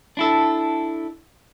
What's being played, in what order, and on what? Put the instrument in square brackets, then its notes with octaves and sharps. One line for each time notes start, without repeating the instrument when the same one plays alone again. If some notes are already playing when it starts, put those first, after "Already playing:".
[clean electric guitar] D4 E4 A4